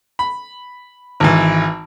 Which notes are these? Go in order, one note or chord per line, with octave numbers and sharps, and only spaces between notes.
B5
G#1 E3